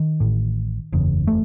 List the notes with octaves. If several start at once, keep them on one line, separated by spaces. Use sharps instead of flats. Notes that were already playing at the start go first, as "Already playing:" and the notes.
Already playing: D#3
A1 A2
F#1 E2 C#3
A3